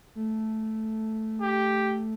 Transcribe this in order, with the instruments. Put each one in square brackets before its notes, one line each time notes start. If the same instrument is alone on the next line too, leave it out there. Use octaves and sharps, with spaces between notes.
[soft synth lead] A3
[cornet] G4